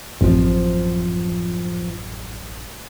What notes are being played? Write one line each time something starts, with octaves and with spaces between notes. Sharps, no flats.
A1 F#2 F3 C4